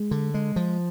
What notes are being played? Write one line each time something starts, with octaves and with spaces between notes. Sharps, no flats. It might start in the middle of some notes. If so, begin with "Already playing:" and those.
Already playing: G#3
D3
G#3
F3